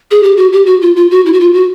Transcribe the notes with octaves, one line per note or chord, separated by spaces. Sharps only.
G#4
G4
F#4
G4
F#4
F4
F4
F#4
E4
F#4
F4
F#4